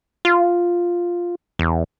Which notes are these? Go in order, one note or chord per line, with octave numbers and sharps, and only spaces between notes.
F4
E2